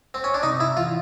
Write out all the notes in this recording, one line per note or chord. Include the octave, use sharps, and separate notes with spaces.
C4
C#4
D4
C3 D#4
E4
E3 F4